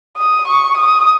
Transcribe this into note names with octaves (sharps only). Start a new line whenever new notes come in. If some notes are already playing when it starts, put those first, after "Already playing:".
D#6
C#6
D#6